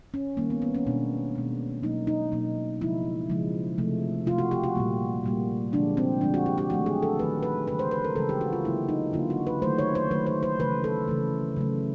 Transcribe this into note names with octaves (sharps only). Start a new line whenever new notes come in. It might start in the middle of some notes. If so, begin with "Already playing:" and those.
C#4
D#3 G3 A#3
B3
B3
C#4
B2 G#3 D4
B2 G#3
B2 F#3 A#3 D#4
D#4
B2 F#3 A#3
C#3 F3 G#3 E4
C#3 F3 G#3
C3 F3 A3
C3 F3 A3 F4
F#4
G4
F#4
A#2 G3 A#3
A#2 G3 A#3
D3 F3 G#3 D4
C4
D3 F3 G#3 D4
F#4
G4
G4
D#3 F#3 A3 F#4
G#4
A4
D#3 F#3 A3 B4
B4
C#3 E3 G#3 B4
C5
B4
A#4
C#3 E3 G#3 A4
G4
F#4
F4
D3 F#3 A#3 E4
D#4
D3 F#3 A#3 F4
F#4
B4
D#3 F#3 A3 C5
C#5
C5
D#3 F#3 A3 B4
C5
C5
C#3 E3 A3 B4
A4
C#3 E3 A3
C#3 F#3 A3